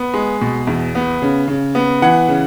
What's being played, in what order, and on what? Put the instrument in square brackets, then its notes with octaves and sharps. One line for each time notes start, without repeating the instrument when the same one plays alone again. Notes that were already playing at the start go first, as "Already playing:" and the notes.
Already playing: [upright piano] B3
G#3
B2
E2
B3
C#3
C#3
B3
E3 F#5
C#3